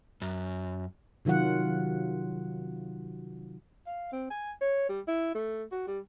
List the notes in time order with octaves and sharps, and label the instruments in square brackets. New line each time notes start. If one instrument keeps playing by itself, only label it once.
[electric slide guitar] F#2
[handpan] C3 D#3 F#3 F4 F#5
[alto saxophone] F5
C4
G#5
C#5
G3
E4
A3
F#4
G3